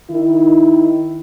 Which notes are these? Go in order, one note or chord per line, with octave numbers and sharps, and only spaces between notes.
D#3 E4